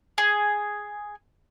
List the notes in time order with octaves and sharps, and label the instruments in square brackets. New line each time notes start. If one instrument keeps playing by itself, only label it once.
[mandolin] G#4